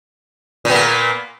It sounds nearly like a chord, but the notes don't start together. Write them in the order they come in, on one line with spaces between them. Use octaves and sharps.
A#2 B3 A#3